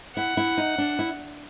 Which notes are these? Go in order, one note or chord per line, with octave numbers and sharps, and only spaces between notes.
E4 F#5
E4
D#4
D4
E4